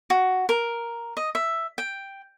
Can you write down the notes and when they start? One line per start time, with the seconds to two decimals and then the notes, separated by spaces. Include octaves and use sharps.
0.10 F#4
0.49 A#4
1.17 D#5
1.35 E5
1.78 G5